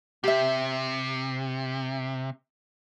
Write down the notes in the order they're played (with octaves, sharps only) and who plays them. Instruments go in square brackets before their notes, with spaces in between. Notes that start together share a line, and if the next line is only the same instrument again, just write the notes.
[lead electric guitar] C3 [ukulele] G4 E5